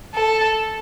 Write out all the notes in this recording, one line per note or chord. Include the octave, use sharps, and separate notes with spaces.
A4